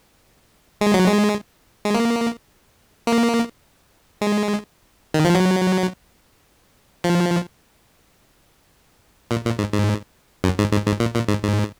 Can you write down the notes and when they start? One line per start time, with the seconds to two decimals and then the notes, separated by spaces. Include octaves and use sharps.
0.81 G#3
0.94 F#3
1.08 G#3
1.85 G#3
1.94 A#3
3.07 A#3
4.21 G#3
5.14 D#3
5.24 F3
5.35 F#3
7.04 F3
9.31 A#2
9.45 A#2
9.59 G#2
9.73 G#2
10.44 F#2
10.59 G#2
10.72 G#2
10.87 G#2
11.00 A#2
11.14 A#2
11.29 G#2
11.43 G#2